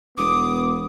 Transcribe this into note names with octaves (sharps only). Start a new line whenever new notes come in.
E1 B3 D6 D#6